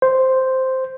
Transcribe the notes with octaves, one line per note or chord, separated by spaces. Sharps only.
C5